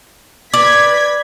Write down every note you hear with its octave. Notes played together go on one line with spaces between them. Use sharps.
B4 D5 G#6 B6